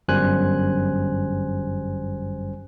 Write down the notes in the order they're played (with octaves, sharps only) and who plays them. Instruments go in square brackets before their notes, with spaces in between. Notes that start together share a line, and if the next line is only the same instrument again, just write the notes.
[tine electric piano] G1 F#2 G3 C5 G#5 F#6